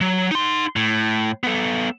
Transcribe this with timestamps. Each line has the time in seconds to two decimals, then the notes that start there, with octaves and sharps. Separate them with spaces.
0.01 F#3
0.31 D#4 C6
0.76 A2
1.43 B3 A4